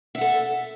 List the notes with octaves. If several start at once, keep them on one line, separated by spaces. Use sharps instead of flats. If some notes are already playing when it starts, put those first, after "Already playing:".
A4 E5 F#5